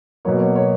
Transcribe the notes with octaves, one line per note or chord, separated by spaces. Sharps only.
B2 F#3 A#3 C#5
C#5
C#5